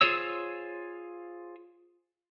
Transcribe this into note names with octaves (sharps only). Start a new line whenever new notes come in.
F4 G#4 C5 C#5 E6